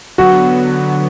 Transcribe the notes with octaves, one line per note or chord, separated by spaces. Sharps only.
D3 F#3 B3 F#4